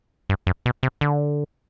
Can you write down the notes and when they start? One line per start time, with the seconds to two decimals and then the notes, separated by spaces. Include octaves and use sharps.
0.29 G2
0.47 F#2
0.66 B2
0.83 C3
1.01 D3